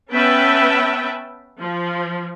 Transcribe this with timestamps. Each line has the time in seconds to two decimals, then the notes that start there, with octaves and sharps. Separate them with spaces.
0.12 B3 C#4 B4 E5 G5 A5
1.59 F3